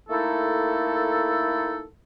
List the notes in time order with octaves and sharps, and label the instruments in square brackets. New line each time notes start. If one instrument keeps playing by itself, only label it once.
[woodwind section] A3 A#3 D#4 E4 A4